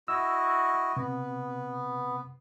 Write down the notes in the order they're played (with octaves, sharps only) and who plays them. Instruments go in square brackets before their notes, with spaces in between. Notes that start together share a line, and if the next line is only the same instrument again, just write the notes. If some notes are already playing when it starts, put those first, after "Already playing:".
[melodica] E4 F#4 D#5 [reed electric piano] E6
[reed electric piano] C3 [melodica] B3